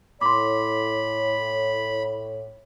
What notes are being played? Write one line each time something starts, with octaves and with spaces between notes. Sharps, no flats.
A2 C#5 B5 C6 D6